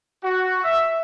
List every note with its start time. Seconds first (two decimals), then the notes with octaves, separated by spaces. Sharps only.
0.24 F#4
0.64 E5